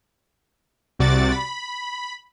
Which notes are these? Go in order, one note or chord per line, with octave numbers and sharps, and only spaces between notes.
C2 C3 F#4 D5 D6 A6
B5